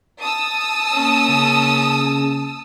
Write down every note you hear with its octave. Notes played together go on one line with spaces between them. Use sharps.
A5 D#6 E6
A#3 C#4
C#3